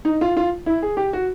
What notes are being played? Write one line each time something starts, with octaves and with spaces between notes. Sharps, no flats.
D#4
F4
F4
E4
G#4
G4
F#4